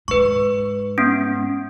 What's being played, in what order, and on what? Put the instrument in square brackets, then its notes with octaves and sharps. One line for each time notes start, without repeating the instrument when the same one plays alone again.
[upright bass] G#2 [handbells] B4 C#6
[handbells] B3 C#4